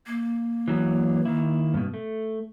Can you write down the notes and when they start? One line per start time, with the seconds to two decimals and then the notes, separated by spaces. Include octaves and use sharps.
0.07 A#3
0.68 E3 F#3 B3
1.25 D#3 E4
1.74 G2 B2
1.94 A3